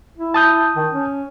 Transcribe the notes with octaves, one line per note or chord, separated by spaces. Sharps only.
E4
A5 D#6 G6
D#3
C#4